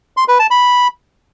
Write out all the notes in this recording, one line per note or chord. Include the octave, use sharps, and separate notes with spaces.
C6
B4
A5
B5